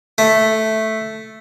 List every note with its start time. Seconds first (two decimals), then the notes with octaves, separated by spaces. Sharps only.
0.18 A3